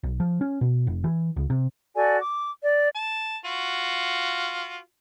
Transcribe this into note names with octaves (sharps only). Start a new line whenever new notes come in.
B1
F3
C#4
B2
F1
E3
C#2
C3
F#4 A4 D5 G#5
D6
D5
A5
F4 F#4